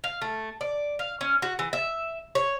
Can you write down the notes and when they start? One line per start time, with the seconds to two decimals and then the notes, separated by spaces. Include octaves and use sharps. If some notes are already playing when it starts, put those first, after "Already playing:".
0.04 F5
0.22 A3
0.61 D5
0.99 F5
1.21 C#4
1.42 F#4
1.59 E3
1.73 E5
2.35 C#5